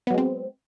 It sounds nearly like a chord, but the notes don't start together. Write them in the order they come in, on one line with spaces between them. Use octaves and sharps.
B3 F#3 G#3 C4